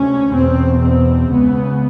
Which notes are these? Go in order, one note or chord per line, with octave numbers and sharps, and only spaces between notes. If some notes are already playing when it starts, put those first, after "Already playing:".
Already playing: D2 C3 C#4
E2 B2 C4
C4
C#2 C#3 B3